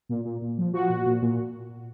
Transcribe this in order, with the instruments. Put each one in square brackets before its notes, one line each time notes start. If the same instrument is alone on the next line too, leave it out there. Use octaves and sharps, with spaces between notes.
[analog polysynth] A#2
A#2
A#2
F3
F3 F#4
A#2
A#2
A#2